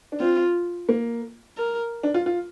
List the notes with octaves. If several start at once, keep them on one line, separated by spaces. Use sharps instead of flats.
D4
C4 F4
A#3
A#4
D4
F4
F4